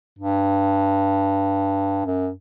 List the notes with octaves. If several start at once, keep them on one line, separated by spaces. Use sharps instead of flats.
G2
F#2